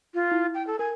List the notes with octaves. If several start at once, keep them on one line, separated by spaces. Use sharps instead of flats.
F4
E4
G5
A4
A#4 G#5